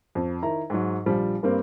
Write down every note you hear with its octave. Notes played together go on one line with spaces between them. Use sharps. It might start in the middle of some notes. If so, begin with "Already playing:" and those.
F2
D#3 E4 A#5
G#2 F#3
A#1 F3 G3
G2 G3 A#3 C4